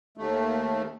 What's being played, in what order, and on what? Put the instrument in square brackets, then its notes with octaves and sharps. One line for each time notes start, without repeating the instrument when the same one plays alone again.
[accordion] D#2 A3